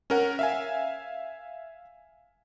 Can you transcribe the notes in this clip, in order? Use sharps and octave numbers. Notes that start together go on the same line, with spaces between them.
C#4 A#4 F#5
E5 F5 G#5